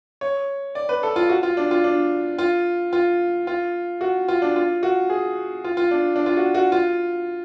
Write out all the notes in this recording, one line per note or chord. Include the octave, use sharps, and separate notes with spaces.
C#5
D5
B4
A4
F4
F#4
F4
D4
F4
D4
F4
F4
F4
F#4
F4
D4
F4
F#4
G#4
F4
F4
D4
D4
F4
F#4
F#4
F4